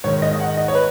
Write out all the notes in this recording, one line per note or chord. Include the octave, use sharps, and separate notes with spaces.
G#2 D#3 C#5
D#5
D#5
F#5
D#5
C#5
B4